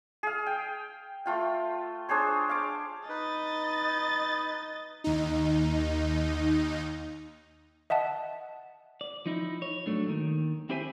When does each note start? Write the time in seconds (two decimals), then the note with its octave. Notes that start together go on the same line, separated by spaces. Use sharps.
0.23 G#4 F5
0.46 G5
1.26 A3 F4 G5
2.09 D4 G#4 C5 C#5
2.49 F5 D6
3.09 D#4 B4 D#5 A6
5.04 D#2 D#4
7.90 D#5 E5 F#5 A5
9.01 D5
9.26 F3 D#4 E4
9.62 C#5
9.86 G#2 F#3 A3 D4
10.07 D#2 D#3
10.69 C4 E4 G4 C5 E5 G#5